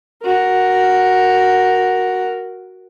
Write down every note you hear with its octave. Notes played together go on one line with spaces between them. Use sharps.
F#4 A#4